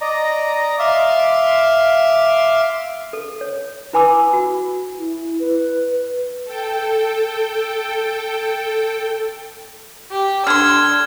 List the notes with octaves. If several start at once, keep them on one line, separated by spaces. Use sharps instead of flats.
D5 D#5 A#5
E5 F5 C6 D6
A4
C#5
E4 B4 G#5 B5 D6 E6
F#4
E4
B4
A4 G5
G4
D3 C6 E6 F6 G#6